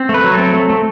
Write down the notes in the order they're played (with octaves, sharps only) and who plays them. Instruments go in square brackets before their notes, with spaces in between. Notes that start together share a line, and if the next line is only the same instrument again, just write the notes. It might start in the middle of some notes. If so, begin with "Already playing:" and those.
Already playing: [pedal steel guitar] C4
A3
B4
F#3
C4 A4
A3
A3